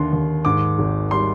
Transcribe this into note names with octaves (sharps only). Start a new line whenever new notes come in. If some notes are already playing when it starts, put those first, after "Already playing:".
Already playing: D#2 D3 C6
D#2
G#2 D6
G#1
G3 C6